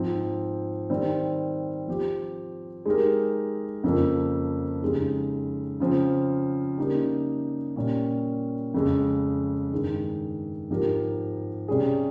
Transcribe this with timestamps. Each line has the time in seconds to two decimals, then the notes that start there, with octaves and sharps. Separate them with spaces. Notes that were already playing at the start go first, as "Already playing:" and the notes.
Already playing: G#2 F3 C4
0.90 D#3 G3 C4
1.87 F3 C4 G4
2.86 G#3 D#4 G4 A#4
3.84 F2 C#3 F3 A#3 F4
4.82 F2 C#3 G#3 D#4 G4
5.80 C#3 F3 C4
6.78 C#3 G3 A#3 D#4 G4
7.76 A#2 G3 A#3 C#4
8.74 F2 C#3 G#3
9.72 G2 D#3 G#3
10.70 G#2 F3 C4 G4 A#4
11.68 C3 G3 C#4 G#4